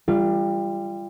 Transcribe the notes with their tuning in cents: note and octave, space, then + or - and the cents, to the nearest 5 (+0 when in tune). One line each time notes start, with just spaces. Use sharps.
G3 +20 F4 -30